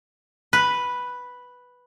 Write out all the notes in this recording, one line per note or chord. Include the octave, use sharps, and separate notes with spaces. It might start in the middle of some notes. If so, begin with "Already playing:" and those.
B4